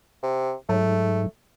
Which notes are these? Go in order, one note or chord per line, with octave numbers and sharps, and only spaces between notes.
C3
G#2 F#3 A3